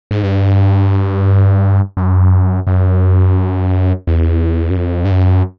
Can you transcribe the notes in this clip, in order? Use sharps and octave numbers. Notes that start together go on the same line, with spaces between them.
G#2
G2
F#2
F#2
E2
F#2
F2
G2
F#2